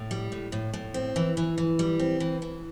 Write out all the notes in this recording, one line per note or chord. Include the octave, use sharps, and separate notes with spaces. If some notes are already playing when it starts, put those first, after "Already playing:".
Already playing: A2
G3
A2
A2
A2
C4
E3
E3
E3
G3
C4
E3
E3